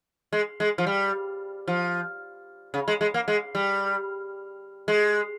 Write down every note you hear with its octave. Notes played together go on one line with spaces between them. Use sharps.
G#3
G#3
F3
G3
F3
C#3
G#3
G#3
A#3
G#3
G3
G#3